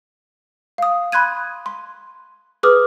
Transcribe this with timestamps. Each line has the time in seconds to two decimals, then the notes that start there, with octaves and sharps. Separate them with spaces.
0.78 F5 D#6
1.12 B5 C6 F#6 G#6 D#7
1.66 C6
2.63 G#4 B4 D6 D#6 F6